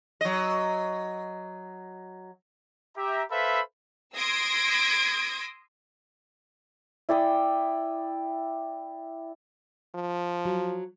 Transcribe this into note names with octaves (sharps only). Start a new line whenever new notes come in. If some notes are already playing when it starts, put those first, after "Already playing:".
F#3 D#5
G4 E5 A#5
A4 B4 C5 E5 F5 B5
C6 D#6 E6 G#6 A#6 D7
E4 D5 G5 D#6
F3
F#3